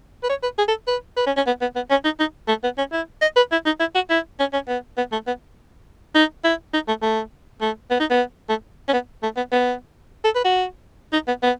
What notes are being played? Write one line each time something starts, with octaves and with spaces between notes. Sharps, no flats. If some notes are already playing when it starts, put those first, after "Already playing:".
B4
C#5
B4
G#4
A4
B4
B4
C#4
C#4
B3
B3
B3
C#4
D#4
D#4
A3
B3
C#4
E4
D#5
B4
E4
D#4
E4
F#4
E4
C#4
C#4
B3
B3
A3
B3
D#4
E4
D#4
A3
A3
A3
B3
D#4
B3
A3
C#4
B3
A3
B3
B3
A4
B4
F#4
D#4
B3
B3